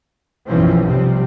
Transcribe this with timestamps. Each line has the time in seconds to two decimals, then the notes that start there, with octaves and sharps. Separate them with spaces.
0.48 B1 F#2 E3 F3 C4 C#4
0.86 C3 F3 G3 C4